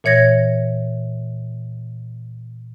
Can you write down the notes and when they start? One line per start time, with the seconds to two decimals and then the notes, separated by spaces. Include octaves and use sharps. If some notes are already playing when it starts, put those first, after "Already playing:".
0.04 A#2 E3 C#5 G#6 A#6